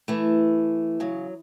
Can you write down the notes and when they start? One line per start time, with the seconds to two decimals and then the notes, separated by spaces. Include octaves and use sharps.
0.08 E3 A3
1.00 C#3 F#3